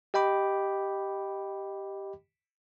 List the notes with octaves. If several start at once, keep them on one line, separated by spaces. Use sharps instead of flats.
G4 D#5 G5 B5 D6